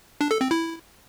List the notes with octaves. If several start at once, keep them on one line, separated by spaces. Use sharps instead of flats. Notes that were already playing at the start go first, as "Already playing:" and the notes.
D4
A4
C4
E4